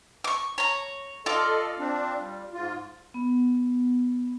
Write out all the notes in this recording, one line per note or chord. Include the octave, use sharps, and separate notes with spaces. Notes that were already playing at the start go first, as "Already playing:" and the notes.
C#6 D6
C#5 A#5
F4 A4 D5 D#5
C4 D4
G3
G#2 F4
B3